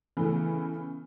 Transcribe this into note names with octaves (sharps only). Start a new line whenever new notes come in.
C#3 E3 A3 B3 C#4